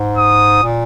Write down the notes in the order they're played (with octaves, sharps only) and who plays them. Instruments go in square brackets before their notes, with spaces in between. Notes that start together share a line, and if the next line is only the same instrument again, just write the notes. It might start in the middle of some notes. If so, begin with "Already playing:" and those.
Already playing: [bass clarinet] G#2
[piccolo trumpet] D#6
[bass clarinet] A#2